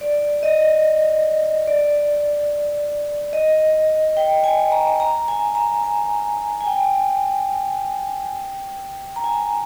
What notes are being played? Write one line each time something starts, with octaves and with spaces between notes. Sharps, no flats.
D5
D#5
D5
D#5
G5
G#5
A#5
A#5
G#5
A#5
G#5
G#5
G5
A#5
G#5
A#5